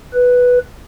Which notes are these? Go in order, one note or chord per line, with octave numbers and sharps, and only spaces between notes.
B4